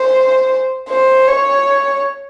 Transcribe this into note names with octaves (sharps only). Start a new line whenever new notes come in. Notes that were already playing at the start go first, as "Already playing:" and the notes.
Already playing: C5
C5
C#5